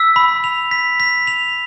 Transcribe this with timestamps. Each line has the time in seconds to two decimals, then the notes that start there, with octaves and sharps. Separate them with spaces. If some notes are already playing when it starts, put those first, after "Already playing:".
Already playing: E6 B6
0.16 B5
0.44 F7
0.71 B6
1.00 B6
1.27 F7